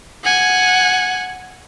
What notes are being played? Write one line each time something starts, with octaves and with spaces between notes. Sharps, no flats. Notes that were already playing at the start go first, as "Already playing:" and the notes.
F#5 G#5